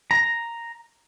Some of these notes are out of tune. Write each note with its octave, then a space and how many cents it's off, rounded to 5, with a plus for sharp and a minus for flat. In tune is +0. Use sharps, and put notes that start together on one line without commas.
A#5 +0